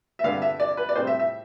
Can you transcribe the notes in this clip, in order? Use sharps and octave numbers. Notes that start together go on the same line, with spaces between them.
E5
G2 D3 G3 B3 F5
E5
D5
B4
D5
A2 G3 C4 C5
E5
E5